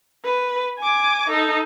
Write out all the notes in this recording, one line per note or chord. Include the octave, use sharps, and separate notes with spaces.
B4
G#5 D6
D#4 A4